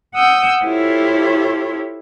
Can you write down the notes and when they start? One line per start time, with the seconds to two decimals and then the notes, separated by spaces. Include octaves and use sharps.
0.15 F#5 D#6 E6 G6
0.64 E4 F4 G4 A4 C5 C#5